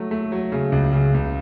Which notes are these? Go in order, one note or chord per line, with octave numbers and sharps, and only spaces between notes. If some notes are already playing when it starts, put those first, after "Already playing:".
Already playing: F#3 A3
A3
F#3
C#3
C#2
C#3
C#2